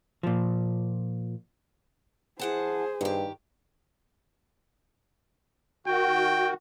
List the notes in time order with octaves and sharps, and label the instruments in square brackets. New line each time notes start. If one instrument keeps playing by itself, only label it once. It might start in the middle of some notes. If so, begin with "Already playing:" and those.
[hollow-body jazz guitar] A#2 F3
[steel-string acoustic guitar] E3 F#5 A5 [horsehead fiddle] G#4 C5
[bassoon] G2 [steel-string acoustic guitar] D#3 G4
[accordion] D#3 F#4 [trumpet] G5